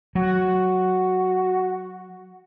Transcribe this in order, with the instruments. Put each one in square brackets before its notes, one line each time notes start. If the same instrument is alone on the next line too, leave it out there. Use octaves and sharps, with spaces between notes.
[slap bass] F#3 [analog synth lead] F#4